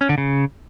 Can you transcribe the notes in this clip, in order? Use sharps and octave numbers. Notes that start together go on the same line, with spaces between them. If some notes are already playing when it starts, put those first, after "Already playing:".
C#4
D3
C#3